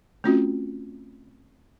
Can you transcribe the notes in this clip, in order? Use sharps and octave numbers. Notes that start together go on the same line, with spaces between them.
A3 C4 C#4 F4 F#4